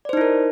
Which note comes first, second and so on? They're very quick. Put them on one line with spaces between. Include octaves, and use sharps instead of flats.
D5 C5 D#4 E4 A#4